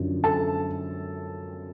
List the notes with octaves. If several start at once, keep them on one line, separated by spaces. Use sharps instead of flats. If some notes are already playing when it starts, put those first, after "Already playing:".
Already playing: F#2 D3 F3
A4 A5